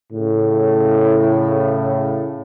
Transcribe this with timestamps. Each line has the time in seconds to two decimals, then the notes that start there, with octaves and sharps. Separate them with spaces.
0.13 A2 C#3